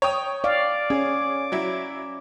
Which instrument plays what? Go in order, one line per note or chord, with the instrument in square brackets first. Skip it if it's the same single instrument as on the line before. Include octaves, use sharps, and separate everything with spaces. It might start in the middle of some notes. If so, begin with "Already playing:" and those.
[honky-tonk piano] C#5 G5 D#6
[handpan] D5 F5 [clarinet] D6
[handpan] C#4 [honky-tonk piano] G#4
[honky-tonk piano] F#3 E4